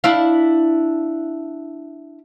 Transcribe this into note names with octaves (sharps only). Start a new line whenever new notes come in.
D4 E4 F5